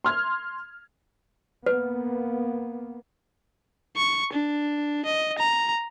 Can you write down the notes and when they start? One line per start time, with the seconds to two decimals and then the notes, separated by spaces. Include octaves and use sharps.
0.04 C6 F6 G#6
1.66 A#3 B3 B4
3.97 C#6
4.33 D4
5.06 D#5
5.39 A#5